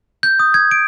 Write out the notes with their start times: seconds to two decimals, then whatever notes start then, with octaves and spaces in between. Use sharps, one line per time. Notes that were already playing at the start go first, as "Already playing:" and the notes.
0.23 G6
0.39 D#6
0.54 G#6
0.71 D7